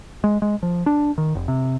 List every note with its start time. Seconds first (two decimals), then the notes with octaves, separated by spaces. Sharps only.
0.24 G#3
0.42 G#3
0.63 F3
0.86 D4
1.18 D#3
1.35 F1
1.48 C3